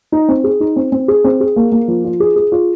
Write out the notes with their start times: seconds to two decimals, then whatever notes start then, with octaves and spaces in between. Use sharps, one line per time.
0.12 D#4
0.29 C4
0.44 G#4
0.60 D#4
0.76 C4
0.92 C4
1.08 G#4
1.24 C4
1.40 G#4
1.56 A#3
1.72 A#3
1.88 F3
2.04 F4
2.20 G#4
2.36 G#4
2.52 F4